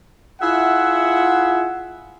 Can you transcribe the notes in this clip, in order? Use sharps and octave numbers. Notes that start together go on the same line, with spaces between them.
E4 F4 G#4 E5 F#5